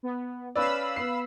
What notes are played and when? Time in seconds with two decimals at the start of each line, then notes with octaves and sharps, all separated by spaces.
0.03 B3
0.56 C#4 B4 D5 F5 B5 E6
0.96 B3 C7